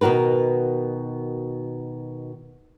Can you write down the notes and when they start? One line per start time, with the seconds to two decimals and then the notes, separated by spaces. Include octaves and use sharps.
0.01 B2 D#3 F#4 A#4 B4